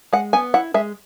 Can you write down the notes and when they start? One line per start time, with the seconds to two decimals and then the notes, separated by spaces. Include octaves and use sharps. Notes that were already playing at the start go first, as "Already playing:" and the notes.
0.13 G#3 F#5
0.33 B3 G#5
0.54 E4 F#5
0.74 G#3 E5